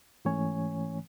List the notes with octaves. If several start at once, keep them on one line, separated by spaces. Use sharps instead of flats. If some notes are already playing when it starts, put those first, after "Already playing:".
G#2 E3 A3 C#4 C#5 G#5